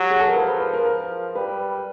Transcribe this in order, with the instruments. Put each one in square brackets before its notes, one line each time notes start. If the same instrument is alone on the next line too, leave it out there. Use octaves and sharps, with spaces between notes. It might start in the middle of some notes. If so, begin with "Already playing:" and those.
Already playing: [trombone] F#3 [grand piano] G4
[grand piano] G#4
A4
A#4
[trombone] F3 [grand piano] B4
[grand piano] B4
B4
A#4
[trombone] F3 [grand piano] A#4
[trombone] G3 [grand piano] B4